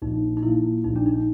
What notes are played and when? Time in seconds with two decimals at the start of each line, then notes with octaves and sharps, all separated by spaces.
0.02 A#1 D#4
0.37 D#4
0.43 A#2 F3 A#3 E4
0.84 A#1 D#4
0.96 D4
1.06 D#4